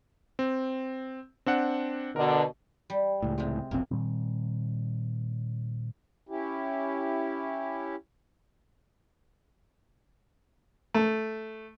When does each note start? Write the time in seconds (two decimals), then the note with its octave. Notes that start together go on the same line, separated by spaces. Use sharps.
0.39 C4
1.46 C4 D4 F#5
2.16 B2 D3 A#4
2.90 G3
3.22 C#2 A2
3.38 C3 G#3
3.71 E1 A#1 A#3 C4
3.91 A#2 D#3 G3 C4
6.29 C#4 E4 G4
10.94 A3